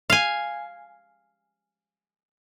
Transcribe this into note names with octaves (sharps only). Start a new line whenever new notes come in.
F5 G#5